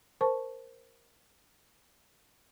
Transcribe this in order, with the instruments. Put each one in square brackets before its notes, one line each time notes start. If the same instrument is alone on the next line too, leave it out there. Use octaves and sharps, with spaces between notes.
[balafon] A#4 C5 A5 C#6